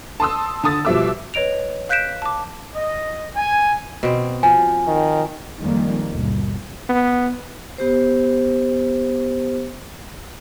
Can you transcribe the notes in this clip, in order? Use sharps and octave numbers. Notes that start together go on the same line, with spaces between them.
A5 C6 D#6 E6
D3 A5 D#6 A6
B2 F3 G3 E5 D6 E6
B4 C#5 D#5 D7 F7
F5 F#6 G6 B6 D7 E7
A5 D6
D#5
G#5
B2 C4
F3 G#5
D#3
F2 D#3 F3 G3 G#3 A#3
G1 D#2 B2
B3
B3 G4 C5